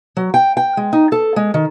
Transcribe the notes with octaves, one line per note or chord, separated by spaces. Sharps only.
F#3
G5
G5
G#3
D#4
A4
G#3
D#3